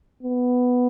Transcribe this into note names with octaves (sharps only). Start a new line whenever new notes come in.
B3